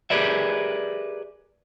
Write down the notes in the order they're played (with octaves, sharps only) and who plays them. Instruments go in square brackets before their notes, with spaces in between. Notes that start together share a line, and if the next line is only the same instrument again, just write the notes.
[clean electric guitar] G4 G#4 A#4 B4 D5 E5